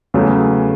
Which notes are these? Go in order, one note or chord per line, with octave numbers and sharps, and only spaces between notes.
E2 C#3 F#3 A3